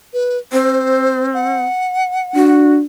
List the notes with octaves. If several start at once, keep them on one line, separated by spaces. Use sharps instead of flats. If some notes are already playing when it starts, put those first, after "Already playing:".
B4
C4 C5
F#5
D4 F#4